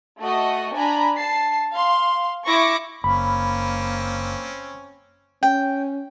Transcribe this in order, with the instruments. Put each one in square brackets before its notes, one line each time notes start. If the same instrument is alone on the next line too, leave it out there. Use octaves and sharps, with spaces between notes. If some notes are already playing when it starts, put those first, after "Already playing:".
[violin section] A3 F#4 D#5
D4 G#5 A#5 B5
A5 C7
F5 C6
E4 C#6 D6 A#6 C#7
[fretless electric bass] F#1 [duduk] A#3 [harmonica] C4 C#4 [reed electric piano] B5
[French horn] C#4 [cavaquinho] G5